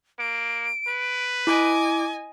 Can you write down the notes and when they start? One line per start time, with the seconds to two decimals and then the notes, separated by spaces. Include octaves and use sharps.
0.19 A#3 D7
0.88 B4
1.47 E4 D#5 G#5 D6